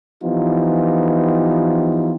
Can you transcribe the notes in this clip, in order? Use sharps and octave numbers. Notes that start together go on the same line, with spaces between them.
E3 F3 B3 D#4 F4 G4